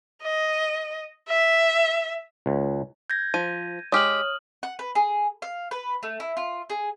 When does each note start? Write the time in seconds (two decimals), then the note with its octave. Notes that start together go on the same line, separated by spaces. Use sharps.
0.23 D#5
1.29 E5
2.46 C#2
3.10 G6 G#6 A#6
3.34 F3 D#7
3.92 G#3 G4 C#5 D#6 F6 F#7
4.63 F#5
4.79 B4
4.95 G#4
5.42 F5
5.71 B4
6.03 A3
6.20 E4
6.37 F4
6.70 G#4